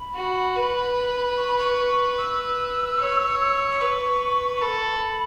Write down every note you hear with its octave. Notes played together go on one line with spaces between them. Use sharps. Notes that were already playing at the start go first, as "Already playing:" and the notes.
Already playing: B5
F#4
B4
C#6
B5
C#6
E6
C#5
E6
B4 C#6
C#6
A4 B5